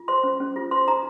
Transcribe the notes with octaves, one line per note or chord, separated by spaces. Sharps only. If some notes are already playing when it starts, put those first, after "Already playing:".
Already playing: F4
C5 C6
C#4
C#4
F4
C5 C6
D#4 A#5